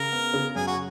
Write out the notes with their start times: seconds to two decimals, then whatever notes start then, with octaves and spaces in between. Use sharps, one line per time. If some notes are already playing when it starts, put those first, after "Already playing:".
Already playing: C#3 A#4
0.12 B3
0.34 C#3
0.56 F#2 G#4
0.67 F#4